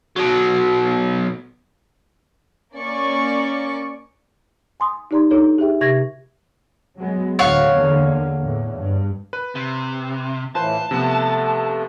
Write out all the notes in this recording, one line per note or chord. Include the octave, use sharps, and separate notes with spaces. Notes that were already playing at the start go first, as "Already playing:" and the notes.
B2 F#3
A#3 C#4 D5 C#6
G#5 C6 D#6
D#4 G4 D5 A#5 C6
D4 D#4 F4 A4 B4 C#5
G4 G#4 E5 G5
C3 G4 E5 C#6 G#6 A#6
F#3 G#3 B3
D2 A2 C#5 F5 F#5
E2 D3 A#3
E2 A2 E3
G2
B4
C3
A2 E3 F4 B4 C5 A5
C3 F3 A3 B3